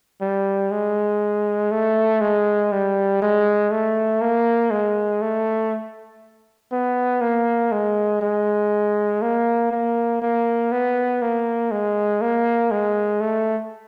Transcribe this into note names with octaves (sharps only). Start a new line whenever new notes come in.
G3
G#3
A3
G#3
G3
G#3
A3
A#3
G#3
A3
B3
A#3
G#3
G#3
A#3
A#3
A#3
B3
A#3
G#3
A#3
G#3
A3